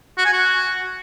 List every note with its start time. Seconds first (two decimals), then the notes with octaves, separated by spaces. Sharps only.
0.18 F#4
0.25 G#5
0.33 F#4